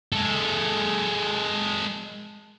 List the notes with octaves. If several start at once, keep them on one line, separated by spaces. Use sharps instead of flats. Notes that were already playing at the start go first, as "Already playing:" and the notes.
G#3 A4